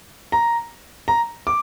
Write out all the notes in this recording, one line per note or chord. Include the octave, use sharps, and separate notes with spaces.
A#5
A#5
D6